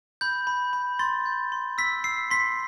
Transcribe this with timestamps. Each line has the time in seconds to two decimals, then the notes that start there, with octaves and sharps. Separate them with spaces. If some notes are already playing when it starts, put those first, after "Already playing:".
0.21 B5 G6
0.47 B5
0.73 B5
0.99 C6 A6
1.26 G6
1.52 C6
1.78 E6 B6
2.04 E6 C7
2.31 C6 B6